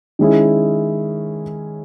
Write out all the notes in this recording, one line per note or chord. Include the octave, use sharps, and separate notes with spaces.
D#3 G#3 C#4 E4 G#4